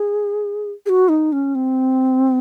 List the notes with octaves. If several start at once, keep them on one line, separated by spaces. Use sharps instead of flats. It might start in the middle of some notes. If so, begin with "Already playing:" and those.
Already playing: G#4
G#4
F#4
D#4
C#4
C4